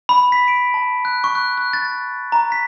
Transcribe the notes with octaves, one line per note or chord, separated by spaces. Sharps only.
B5
B6
D7
A5
F#6
C#6
F#6
F#6
A6
A#5
B6